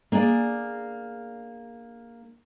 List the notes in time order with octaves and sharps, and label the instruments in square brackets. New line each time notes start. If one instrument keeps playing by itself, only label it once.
[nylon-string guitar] A#3 D4 G#4 D5